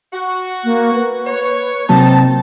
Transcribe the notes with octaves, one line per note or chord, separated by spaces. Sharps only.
F#4
A#3
B4
C#5
C3 F#3 A#3 C4 D#4 A5